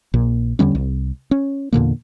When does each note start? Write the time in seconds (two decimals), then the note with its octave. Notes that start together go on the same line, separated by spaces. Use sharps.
0.14 A#1 A#2
0.59 E2 D3 G3 C#4
0.75 C2
1.31 C#4
1.73 E2 A#2 D3 A#3